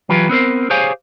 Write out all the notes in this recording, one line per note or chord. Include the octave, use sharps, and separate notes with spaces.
E3 F#3 F4 G4 B4
B3 C4 A#4 C5
G4 G#4 C5 C#5 F5 G#5